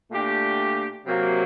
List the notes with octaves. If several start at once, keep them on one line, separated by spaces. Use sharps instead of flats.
A#2 A3 D4 G4
C3 F#3 A#3